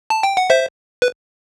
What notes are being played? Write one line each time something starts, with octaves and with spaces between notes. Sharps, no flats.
A5
G5
F#5
C5 E5
B4